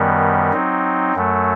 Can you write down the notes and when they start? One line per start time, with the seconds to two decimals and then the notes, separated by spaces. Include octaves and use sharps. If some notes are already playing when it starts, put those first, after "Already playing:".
Already playing: F#2 D#3 G3 B3
0.52 F#3 C4 D#4
1.15 F#2 F#3 A3